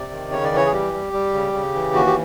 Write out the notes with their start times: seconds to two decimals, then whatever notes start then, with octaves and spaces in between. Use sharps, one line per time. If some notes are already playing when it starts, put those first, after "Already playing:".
Already playing: C3 D5
0.12 D#3
0.32 C#3 C#5
0.44 D5
0.52 E3 C#5
0.66 G#4
0.72 G3 G4
0.93 G3
1.13 G3
1.34 C#3
1.53 C#3
1.75 E3
1.94 D#2 F#4
2.07 G4